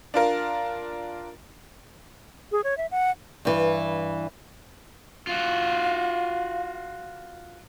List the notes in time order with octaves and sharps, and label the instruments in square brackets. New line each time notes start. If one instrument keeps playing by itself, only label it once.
[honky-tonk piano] D4 F4 A#4
[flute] G#4
C#5
E5
F#5
[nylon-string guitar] G2 E3
[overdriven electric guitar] F4 F#4 [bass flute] F5